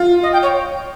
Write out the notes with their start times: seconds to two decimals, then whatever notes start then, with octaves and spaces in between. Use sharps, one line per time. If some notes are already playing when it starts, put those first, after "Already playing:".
Already playing: F4
0.23 D#5
0.33 G5
0.42 C#5